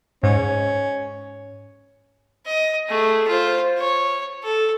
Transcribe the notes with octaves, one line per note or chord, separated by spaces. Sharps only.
G#2 C#4
D#5
A3 G#4
F4 C5
C#5
A4